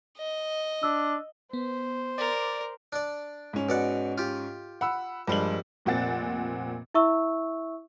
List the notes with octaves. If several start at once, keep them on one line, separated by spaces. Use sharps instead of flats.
D#5
D4 E6
B3 C5
A#4 D5
D4 D5
G#2 C#4
B2 D5 F#5
F4 G4
F#5 B5 E6
A#1 G2 G3 G#3 F#7
F1 A#2 C4 F#5 A6
E4 E5 C#6 E6